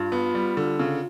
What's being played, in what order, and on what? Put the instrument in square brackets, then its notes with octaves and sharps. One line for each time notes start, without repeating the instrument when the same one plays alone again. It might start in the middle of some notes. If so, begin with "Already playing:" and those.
Already playing: [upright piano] G2 [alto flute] F4
[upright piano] B3
G3
D3
C#3